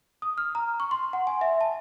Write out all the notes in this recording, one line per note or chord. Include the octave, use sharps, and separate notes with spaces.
D#6
F6
A#5
C#6
C6
F#5
G#5
E5
A5